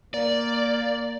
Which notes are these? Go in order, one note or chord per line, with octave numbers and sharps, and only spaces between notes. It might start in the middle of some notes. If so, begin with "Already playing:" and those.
A#3 D5